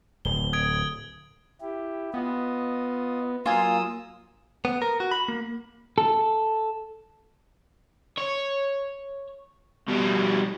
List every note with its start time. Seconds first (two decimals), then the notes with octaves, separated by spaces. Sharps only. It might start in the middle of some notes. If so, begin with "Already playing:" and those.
0.25 D1 G7
0.53 D#6 G#6 D7
1.61 E4 G4
2.14 B3 F4 D#5
3.46 F#3 A#3 F4 G#5 D#6 E6
4.65 B3
4.82 A#4
5.00 F#4
5.11 B5
5.28 A#3
5.98 A4
8.18 C#5
9.88 B2 G3